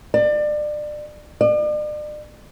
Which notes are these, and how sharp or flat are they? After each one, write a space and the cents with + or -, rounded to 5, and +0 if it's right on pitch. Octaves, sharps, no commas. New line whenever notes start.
D5 +30
D5 +40